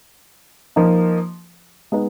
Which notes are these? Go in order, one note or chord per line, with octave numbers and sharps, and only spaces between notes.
F3 A#3 D#4
G#3 B3 D#4